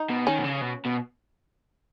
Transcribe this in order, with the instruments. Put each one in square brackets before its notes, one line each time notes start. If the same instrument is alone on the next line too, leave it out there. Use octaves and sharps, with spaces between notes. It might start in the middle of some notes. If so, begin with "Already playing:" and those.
Already playing: [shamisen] D#4
[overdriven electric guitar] B2
[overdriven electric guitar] D#3 [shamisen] C#4
[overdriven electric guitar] B2
C#3
B2
B2